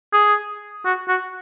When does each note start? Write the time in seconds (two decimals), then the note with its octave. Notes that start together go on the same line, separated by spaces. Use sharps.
0.13 G#4
0.85 F#4
1.08 F#4